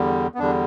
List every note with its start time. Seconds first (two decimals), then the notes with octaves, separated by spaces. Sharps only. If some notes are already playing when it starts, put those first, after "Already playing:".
Already playing: E2 D3 G3
0.34 B3
0.38 E2 D3 G3 D4